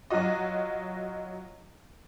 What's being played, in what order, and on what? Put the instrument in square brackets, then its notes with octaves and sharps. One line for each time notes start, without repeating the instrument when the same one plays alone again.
[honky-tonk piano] F#3 F4 F#4 D#5